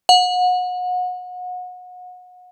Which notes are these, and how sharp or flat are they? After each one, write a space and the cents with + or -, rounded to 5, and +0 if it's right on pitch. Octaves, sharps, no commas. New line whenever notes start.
F#5 -30